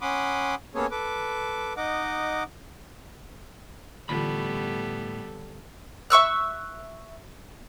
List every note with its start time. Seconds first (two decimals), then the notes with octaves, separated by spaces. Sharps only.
0.01 C#4 F#5 B5 C6 D6 D#6
0.75 A#3 B3 C#4 G#4 A4 C#5
0.91 A4 B4 D6
1.77 D#4 D#5 F#5 D6
4.09 A2 D3 E3 G3 B3 F4 A4 B5
6.10 E5 C#6 E6 F#6